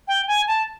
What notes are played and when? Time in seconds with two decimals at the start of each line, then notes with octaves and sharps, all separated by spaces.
0.08 G5
0.28 G#5
0.47 A5